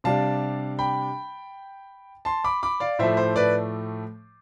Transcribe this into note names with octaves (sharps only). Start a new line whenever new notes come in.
C3 G3 D4 F5 A5
G5 B5
A5 C6
B5 D6
B5 D6
D5 F5
A2 F3 A3 C5 E5
C5
B4 D5